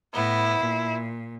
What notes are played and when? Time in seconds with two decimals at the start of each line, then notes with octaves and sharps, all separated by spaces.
0.14 A2 B3 E4
0.59 A#2